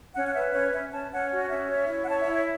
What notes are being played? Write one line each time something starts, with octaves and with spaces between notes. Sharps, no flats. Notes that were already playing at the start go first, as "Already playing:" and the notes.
C#4 F#5
F#5
B4 E5
C#4 C#5
C#4 E5
C#4 A5
C#4 F#5
F#4
C#4 E5
C#5
E4
F#5
C#5 A5
E5
E4
E5